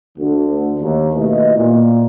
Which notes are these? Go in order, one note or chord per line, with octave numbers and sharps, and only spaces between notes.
D2 D3
D#2
D#2 B2 A3 E4 B4 D#5
A#2